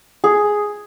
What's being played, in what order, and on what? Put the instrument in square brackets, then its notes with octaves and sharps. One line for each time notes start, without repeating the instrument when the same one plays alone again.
[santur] G#4